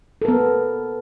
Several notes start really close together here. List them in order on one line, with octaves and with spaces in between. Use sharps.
A4 A#4 B3